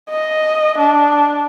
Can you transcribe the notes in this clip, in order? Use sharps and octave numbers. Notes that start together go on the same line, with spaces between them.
D#5
D4